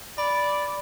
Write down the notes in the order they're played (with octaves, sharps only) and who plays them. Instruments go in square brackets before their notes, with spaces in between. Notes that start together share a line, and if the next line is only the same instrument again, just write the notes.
[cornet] D5 [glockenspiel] B5